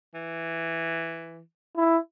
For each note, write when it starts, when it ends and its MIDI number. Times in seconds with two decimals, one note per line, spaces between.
0.14 1.40 52
1.77 1.97 64